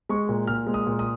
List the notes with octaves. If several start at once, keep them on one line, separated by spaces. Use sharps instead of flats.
G#3 C#6
A#2
A#2 F6
G#3
D#6
A#2
D#6